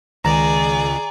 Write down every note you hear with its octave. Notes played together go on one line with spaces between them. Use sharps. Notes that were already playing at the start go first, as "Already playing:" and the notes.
C#2 D#3 G#4 D5 A#5 A#6